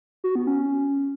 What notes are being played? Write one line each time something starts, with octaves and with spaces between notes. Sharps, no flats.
F#4
B3
C#4